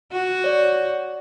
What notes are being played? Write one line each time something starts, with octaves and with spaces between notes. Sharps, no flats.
F#4
C#5 D5